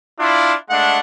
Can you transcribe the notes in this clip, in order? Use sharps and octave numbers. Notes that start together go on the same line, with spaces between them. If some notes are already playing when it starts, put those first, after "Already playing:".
D4 E4 F4
G#3 A3 D4 F#5